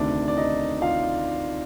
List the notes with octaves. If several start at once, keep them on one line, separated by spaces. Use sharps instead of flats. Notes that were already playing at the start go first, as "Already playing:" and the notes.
Already playing: D2 C3 D#3 D4 D5
D5
D#4 D#5
F4 F5